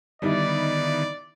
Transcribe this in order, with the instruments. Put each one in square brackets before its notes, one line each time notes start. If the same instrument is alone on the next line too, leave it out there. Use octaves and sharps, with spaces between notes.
[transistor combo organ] D3 D#3 B3 [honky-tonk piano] G3 D#4 E4 [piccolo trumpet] D5